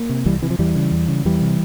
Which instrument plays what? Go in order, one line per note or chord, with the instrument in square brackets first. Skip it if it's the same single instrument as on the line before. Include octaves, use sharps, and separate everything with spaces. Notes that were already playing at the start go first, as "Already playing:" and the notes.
Already playing: [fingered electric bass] A#3
C3
C2 E3 G3
C3 E3
F3
E2 E3 G3
C#3
E2
C#3
E2 E3 G3
C3